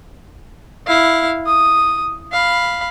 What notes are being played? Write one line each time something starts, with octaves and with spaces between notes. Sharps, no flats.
E4 F5
D#6
F5 B5